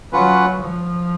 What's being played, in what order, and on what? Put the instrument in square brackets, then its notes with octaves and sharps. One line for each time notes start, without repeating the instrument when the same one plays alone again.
[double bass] F#3 [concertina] C#4 F4 B4 F#5
[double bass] F3